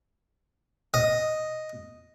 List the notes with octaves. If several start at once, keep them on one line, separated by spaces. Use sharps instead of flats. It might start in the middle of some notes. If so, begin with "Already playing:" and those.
D#5